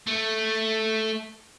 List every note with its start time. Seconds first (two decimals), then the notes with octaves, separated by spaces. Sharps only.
0.07 A3